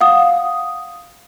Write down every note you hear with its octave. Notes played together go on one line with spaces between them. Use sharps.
F5 F#5 D#6